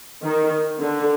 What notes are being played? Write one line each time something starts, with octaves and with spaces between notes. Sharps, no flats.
D#3
D3